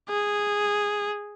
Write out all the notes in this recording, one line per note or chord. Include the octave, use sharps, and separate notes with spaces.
G#4